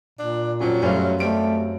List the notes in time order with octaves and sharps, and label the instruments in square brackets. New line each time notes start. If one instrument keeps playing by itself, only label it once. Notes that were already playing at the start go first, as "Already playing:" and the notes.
[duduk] A#2 [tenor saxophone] D4
[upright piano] F2 C#4 [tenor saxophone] F#3
[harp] F#2 C5 F5 [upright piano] G3 A3 C#4
[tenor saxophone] G3 [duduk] A3 [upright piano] C4 D7